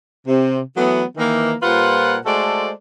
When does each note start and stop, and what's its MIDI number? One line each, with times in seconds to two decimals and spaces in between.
0.27 0.60 48
0.77 1.03 52
0.77 1.03 54
0.77 1.03 57
0.77 1.03 59
1.17 1.53 51
1.17 1.53 52
1.17 1.53 58
1.63 2.16 46
1.63 2.16 55
1.63 2.16 65
1.63 2.16 71
1.63 2.16 72
1.63 2.16 78
2.25 2.70 56
2.25 2.70 57
2.25 2.70 66
2.25 2.70 69
2.25 2.70 72
2.25 2.70 74